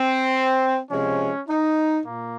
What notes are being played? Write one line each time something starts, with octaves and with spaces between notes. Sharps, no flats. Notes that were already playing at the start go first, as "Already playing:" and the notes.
Already playing: C4
C3 F3 G#3 C#4
D#4
A#2 A#3